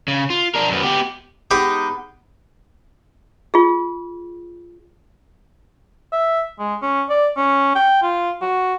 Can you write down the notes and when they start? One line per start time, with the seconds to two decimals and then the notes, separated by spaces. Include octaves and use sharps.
0.08 C#3
0.30 F4
0.54 D4 A#4
0.70 F#2 B3
0.83 B3 G4
1.51 G#3 B3 D#4 G4
3.54 F4 G#4
6.12 E5
6.59 G#3
6.82 C#4
7.09 D5
7.37 C#4
7.75 G5
8.02 F4
8.41 F#4